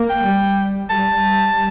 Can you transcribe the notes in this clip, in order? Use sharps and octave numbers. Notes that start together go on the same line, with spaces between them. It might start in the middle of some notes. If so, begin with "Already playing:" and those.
Already playing: A#3
G5
G3
G3 A5